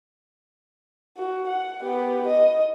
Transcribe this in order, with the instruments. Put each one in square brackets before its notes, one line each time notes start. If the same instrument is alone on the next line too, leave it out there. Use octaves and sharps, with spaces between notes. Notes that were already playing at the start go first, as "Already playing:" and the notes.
[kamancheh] F#4
F#5
B3 G4
D#5